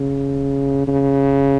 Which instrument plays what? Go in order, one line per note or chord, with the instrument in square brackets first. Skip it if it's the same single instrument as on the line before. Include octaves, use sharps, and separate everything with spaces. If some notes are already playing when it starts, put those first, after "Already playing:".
Already playing: [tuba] C#3
C#3